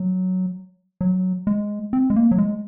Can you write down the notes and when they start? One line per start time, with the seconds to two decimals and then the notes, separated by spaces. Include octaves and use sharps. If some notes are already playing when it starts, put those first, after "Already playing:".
Already playing: F#3
1.01 F#3
1.47 G#3
1.93 C4
2.10 G#3
2.16 A#3
2.31 F#3
2.38 G#3